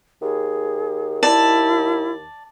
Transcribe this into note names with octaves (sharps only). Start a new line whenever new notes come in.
D#2 G#4
E4 D5 A5